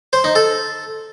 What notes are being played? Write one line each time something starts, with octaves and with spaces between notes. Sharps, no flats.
C5
D#4
A4